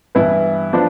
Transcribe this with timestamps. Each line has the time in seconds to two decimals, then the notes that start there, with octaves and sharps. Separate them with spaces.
0.15 G2 E3 B3 E4 B4
0.73 F3 B3 D4